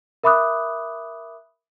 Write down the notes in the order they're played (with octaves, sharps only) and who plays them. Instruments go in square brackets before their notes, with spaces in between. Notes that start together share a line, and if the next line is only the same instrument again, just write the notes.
[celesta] A#4 E5 B5 D6 D#6 F#6